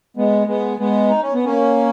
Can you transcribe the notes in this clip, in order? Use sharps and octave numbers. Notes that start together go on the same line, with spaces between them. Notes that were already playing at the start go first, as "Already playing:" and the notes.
G#3 B3
G#3 B3
G#3 B3
D#4
C#4
B3
A#3 C#4